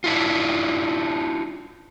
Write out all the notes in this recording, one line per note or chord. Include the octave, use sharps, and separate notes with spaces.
D4 E4 F4